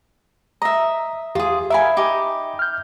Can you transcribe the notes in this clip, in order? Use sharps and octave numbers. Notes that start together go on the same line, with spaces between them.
D#5 E5 A#5
E2 F4 G4 G#4
A#4 E5 F5 G#5 B5
D#4 G4
F6 G6